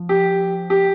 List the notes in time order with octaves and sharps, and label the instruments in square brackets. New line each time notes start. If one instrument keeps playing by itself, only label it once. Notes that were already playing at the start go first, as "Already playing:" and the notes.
Already playing: [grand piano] F3
[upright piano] G4
G4